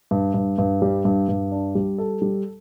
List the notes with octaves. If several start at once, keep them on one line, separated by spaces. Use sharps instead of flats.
G2
G2
G2
G3
G2
G2
D4
G3
A4
G3